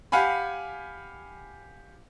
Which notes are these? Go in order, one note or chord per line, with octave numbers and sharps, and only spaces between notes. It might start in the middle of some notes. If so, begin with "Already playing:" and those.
G4 F5 F#5 G#5 B5